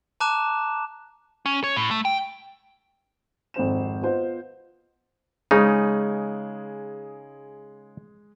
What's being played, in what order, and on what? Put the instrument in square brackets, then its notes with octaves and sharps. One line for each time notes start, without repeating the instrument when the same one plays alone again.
[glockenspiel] A5 A#5 D6 F#6 E7
[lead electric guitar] C#4
C#5
A2
A3
G5
[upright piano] G#1 F2 C5 E7
B3 F4 C5 D#5 F#5
[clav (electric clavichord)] C#3 D#4 [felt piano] G#3 G#4